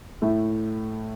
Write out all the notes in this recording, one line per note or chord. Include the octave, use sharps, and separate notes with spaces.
A2 A3 E4